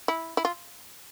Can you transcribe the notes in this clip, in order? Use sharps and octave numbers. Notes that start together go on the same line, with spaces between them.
E4
E4
F4